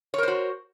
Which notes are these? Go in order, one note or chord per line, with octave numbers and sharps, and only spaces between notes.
F#4 A#4 C5 C#5